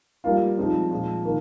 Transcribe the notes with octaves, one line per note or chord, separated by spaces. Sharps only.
G3 A#3 F4
F3 G#3 C4 D#4
A#2 F3 G#3
D#3 A#3